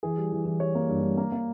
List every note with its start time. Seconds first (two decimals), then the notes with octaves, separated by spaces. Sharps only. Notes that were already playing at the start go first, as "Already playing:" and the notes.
0.03 E3 G#4
0.17 G3
0.32 E3
0.45 E3
0.60 G3 C#5
0.75 A#3
0.89 G2
1.03 G2
1.17 A#3
1.32 A#3